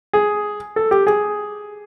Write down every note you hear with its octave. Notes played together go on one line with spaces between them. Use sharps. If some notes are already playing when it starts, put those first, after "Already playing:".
G#4
A4
G4
G#4